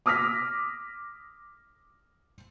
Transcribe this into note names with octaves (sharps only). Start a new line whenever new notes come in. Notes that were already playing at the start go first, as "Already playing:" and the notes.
D6 D#6 F6 A#6 B6